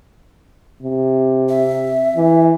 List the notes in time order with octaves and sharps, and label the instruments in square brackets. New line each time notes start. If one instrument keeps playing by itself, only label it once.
[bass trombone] C3
[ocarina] E5
[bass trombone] E3